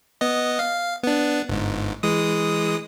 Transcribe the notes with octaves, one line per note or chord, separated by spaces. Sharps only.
B3 D#5
F5
B3 D4
G1 G#2
E3 G#3 D#6